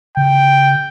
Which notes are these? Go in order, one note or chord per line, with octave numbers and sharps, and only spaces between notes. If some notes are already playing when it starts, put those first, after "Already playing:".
C#3 G5